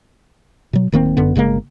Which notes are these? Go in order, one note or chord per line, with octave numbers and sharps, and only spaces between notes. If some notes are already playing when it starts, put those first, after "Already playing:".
B2 F#3
D1 D#3 A#3 C4
G1 F#2 D3 B3
G1 C#3 G#3 A#3